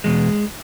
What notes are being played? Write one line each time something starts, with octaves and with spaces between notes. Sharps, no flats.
E2 B2 G#3